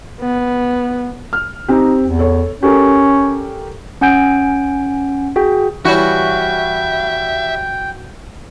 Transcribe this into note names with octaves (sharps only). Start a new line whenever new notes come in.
B3
F6
C4 D#4 G4
E2
A4 C#5
C#4 G4 A4 A#4
C#4 F#5 G#5 G6 D7
F#4 G#4 G5
E3 G3 F#4 C#5 E5 G5